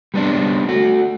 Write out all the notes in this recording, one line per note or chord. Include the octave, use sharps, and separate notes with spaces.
G3 B3 C4 D4
A3 F#4